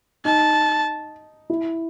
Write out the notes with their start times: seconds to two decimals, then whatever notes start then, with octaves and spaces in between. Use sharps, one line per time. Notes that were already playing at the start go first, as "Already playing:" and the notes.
0.25 D#4 A5
1.50 E4